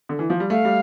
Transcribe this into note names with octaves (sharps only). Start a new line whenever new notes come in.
D3
E3
F3
G3
A3 F5
G3